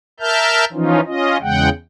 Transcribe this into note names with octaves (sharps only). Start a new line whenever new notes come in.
A#4 E5 A5 F6 G6
E3 F3 C#4 D#4 F4
C#4 F4 D#5
E2 C#3 G#3 F#5 G5